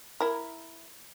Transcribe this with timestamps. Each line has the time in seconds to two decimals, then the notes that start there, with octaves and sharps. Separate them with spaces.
0.20 E4 A#4